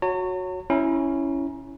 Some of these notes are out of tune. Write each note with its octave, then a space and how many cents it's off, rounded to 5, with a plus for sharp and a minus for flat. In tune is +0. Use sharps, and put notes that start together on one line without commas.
F#4 -10 C#5 +0 A#5 -45
C#4 +0 E4 +0 A#5 +30